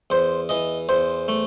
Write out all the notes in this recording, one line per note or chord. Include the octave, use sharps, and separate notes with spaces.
E2 C5
E3 D#5
E2 C5
A3